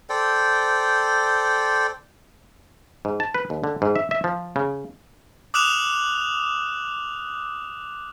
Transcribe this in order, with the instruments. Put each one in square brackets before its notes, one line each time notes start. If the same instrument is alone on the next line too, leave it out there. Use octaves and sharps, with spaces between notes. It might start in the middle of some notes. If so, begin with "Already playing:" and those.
[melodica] A4 C5 D5 G5
[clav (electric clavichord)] G#2
A5
B4
D#2
D3
G#2
E5
E5
F3
C#3
[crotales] D6 D#6 F6 F#6 E7 F7